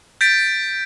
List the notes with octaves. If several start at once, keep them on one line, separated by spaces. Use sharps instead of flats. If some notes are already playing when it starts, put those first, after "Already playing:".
G6 A6 B6 D7